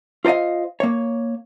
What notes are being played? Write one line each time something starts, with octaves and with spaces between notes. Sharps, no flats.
F4 C5 D5 D#5 F5
A#3 C#5